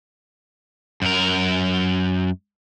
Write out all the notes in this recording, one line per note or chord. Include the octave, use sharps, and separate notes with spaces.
F#2 A#4